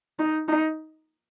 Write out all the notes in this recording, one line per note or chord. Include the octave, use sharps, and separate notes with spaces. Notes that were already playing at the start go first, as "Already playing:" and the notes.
D#4
D#4